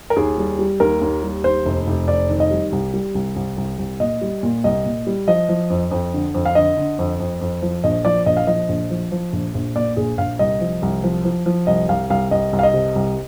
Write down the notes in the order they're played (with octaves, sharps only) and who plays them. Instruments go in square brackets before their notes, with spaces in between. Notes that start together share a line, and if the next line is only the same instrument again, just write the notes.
[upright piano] A#4
D#2 G#4
G3
G3
D#2 A#4
D#2
G3
D#2 C5
F1
F1
F1 D5
D#3
D#5
G3
C2
G3
C2
C2
C2
C2
A#2 D#5
G3
A#2
C2 D#5
A#2
G3
F3 D#5
F3
F2
F2
D3
F2
F5
D3 D#5
D3
F2
F2
F2
F3
A#1 D#5
F3 D5
A#1 D#5
F5
F3 D#5
A#1
F3
F3
A#1
A#1
A#2 D5
A#1 G#4
A#1 F5
C2 D#5
F3
C2
F3
F3
F3
C2 D#5
C2 F5
C2 F5
C2 D#5
C2
F5
D#5
C3
C2